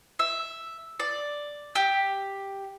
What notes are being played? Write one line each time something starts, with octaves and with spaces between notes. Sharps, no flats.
E5
D5
G4